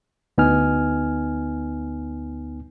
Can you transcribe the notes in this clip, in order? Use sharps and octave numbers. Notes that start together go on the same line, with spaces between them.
D2 B3 D#4 G#5 F6